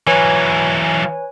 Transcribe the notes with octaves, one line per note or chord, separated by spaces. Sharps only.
E3 F#3 B4 C#5 G#5